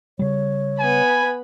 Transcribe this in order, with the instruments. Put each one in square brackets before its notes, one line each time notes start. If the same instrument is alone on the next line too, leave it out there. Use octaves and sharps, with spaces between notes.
[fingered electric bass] C#3 G3 [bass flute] C#5
[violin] B3 B5 [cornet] G#5